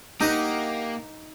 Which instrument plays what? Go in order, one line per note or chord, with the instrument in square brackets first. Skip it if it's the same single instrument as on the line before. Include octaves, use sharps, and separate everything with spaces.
[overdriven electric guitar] A#3 [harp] D#4 [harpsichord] G4 D#5 F#5